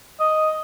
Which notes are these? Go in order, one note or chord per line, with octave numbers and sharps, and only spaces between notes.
D#5